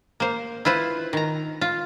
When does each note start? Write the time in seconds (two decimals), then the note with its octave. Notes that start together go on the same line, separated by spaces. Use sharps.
0.20 A#3 C5
0.65 E4 F4 B4 C5
1.13 D#3 A#5
1.61 F4